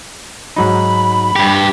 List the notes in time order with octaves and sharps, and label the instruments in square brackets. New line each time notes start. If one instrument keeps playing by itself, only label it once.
[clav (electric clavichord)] G#2 F#3 D#4 [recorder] B5
[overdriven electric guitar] G2 G4